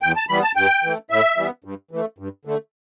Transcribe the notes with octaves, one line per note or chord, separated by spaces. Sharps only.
E2 G5
A5
E3 G3 B3 B5
A5
G2 G5
E3 A3
A2 E5
E3 G3 B3
G2
E3 A3
G2
D3 A3